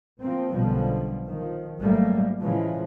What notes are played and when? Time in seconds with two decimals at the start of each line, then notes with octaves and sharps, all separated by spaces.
0.19 F3 A#3 C4
0.52 B1 F#2 B2 D3 F3 G3
1.26 D#3 F3
1.79 G#1 G#2 F#3 G3 A3 A#3
2.41 A2 C#3 E3 F3 G#3